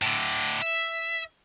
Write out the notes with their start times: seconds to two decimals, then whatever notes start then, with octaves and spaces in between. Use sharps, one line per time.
0.02 A2 D3
0.62 E5